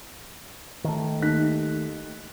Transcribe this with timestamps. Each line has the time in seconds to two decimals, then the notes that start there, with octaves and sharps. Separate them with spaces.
0.84 D#3 A3
1.22 D#2 F#6 B6